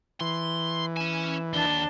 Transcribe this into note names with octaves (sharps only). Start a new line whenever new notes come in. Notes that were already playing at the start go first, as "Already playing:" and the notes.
E3 C6
C#4 G#5 E7
D#2 D4 A5 G7